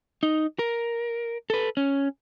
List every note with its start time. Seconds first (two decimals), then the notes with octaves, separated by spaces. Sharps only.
0.23 D#4
0.59 A#4
1.50 A4 B4
1.77 C#4